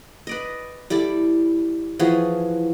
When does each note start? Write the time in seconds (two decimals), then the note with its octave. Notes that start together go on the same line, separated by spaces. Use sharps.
0.27 B4 D5 D#5
0.90 G3 E4 A4 D5
1.99 E3 F3 F#4 G#4